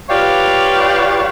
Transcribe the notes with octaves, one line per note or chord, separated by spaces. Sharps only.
F4 G4 B4 C#5 D5 F5